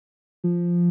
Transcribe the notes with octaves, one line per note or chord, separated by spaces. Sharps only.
F3